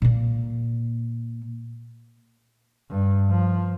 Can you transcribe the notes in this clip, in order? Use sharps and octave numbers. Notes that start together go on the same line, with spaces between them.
A#2 A#3
G2
F3